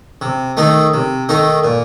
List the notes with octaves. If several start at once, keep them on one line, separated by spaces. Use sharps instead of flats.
C3
D#3 A3 D#4
C3
D#3 A3 D#4
A#2